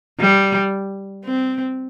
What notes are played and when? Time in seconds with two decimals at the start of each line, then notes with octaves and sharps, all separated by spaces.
0.20 G3
1.25 C4